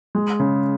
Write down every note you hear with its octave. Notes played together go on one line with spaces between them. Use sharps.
G#3
C#3